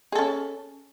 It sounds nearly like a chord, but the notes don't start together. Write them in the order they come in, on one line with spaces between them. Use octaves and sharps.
G#4 A4 C#4